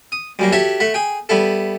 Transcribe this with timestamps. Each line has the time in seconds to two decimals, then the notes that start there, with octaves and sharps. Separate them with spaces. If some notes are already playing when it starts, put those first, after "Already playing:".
0.12 D#6
0.39 F#2 G3 A#3
0.52 F#4 G4 A4 C#5 E5 F#5
0.80 A3 F#5 B5
0.94 G#4 G5
1.29 G3 B3 E4 A4